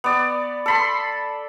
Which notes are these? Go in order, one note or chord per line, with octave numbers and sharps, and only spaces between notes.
B3 D5
A4 B5 C6